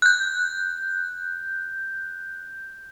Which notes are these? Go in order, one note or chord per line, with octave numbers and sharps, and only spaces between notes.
F#6 G6